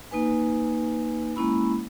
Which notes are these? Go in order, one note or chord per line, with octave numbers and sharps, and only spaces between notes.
A#3 D#4 B4 G#5
G#3 A#3 C#4 E4 B5